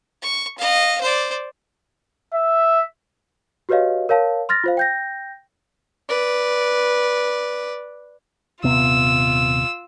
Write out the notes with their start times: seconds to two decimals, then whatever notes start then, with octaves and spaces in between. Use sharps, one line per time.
0.22 C#6
0.58 D#5 F5
1.01 C5 D5
2.34 E5
3.69 F#4 G4 B4 C#5 D#5 F5
4.09 A#4 C#5 F5 A5
4.49 C6 F6 A6 A#6
4.64 F4 C5 F5
4.77 G5 G6 A#6
6.09 B4 D5
8.64 D#1 C3 B3 F4 E6